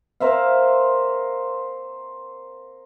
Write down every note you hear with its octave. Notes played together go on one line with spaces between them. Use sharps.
A#4 C5 E5 F5